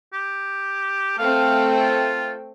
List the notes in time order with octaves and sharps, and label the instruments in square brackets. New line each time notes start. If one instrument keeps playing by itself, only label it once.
[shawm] G4
[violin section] A3 C4 G5 [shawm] F5
[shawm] F4